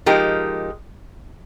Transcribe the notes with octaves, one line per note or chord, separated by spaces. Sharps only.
F3 G#3 D#4 G4 A#4